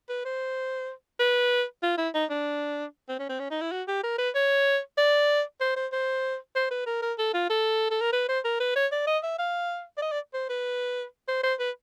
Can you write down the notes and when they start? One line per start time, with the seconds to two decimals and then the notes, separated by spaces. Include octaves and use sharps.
0.09 B4
0.25 C5
1.19 B4
1.83 F4
1.98 E4
2.14 D#4
2.30 D4
3.08 C4
3.19 C#4
3.29 C4
3.39 C#4
3.51 D#4
3.61 E4
3.72 F#4
3.88 G4
4.03 A#4
4.18 B4
4.35 C#5
4.97 D5
5.61 C5
5.76 C5
5.92 C5
6.55 C5
6.71 B4
6.86 A#4
7.02 A#4
7.18 A4
7.34 F4
7.50 A4
7.91 A4
8.01 A#4
8.13 B4
8.28 C5
8.44 A#4
8.60 B4
8.75 C#5
8.92 D5
9.07 D#5
9.23 E5
9.39 F5
9.97 D5
10.02 D#5
10.12 D5
10.33 C5
10.49 B4
11.28 C5
11.43 C5
11.59 B4